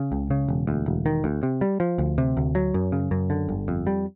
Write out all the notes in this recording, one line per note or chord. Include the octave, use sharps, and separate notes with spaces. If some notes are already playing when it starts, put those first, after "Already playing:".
Already playing: C#3
C#2
C#3
E1
D2
E1
D#3
D2
C3
G3
F3
D2
C3
D2
F#3
F#2
C#3
F#2
D3
G1
F2
G3